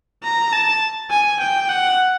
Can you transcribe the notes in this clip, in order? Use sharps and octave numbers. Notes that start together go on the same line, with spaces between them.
A#5
A5
G#5
G5
F#5